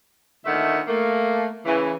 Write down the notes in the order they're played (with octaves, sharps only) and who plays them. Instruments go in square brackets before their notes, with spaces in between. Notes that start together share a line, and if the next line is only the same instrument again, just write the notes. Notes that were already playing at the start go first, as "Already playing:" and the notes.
[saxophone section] D2 A#2 D#3 A3 E5 F#5
A3 A#3
C#3 E3